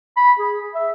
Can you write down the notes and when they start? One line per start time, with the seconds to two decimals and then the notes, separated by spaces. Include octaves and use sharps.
0.17 B5
0.39 G#4
0.75 E5